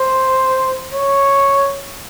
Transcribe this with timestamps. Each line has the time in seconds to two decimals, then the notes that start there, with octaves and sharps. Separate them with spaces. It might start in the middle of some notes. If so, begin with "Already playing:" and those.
Already playing: C5
0.93 C#5